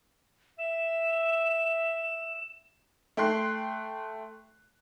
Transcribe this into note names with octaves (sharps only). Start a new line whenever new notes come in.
E5 E7
A3 G5 C6 F#6 C7